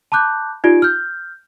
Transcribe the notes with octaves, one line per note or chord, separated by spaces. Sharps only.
A5 B5 D6 F#6 G6
D#4 F4 G4 D5 D7
F6 G6